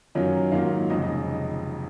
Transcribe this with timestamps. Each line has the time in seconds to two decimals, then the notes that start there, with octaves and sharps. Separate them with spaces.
0.15 F#2 D#3 F#3 C#4 F4
0.51 G#2 D#3 F#3 A#3 F4 F5
0.90 F1 F2 C#3 G#3 D#5
1.02 D#5